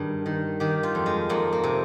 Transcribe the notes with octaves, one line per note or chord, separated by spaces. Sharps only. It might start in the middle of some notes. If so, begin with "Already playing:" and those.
Already playing: G2 D#3 G#4
D#3
D#3 G4
F4
F2
G#3
F2 A#3
A#3
C3